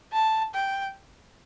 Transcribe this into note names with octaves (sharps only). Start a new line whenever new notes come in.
A5
G5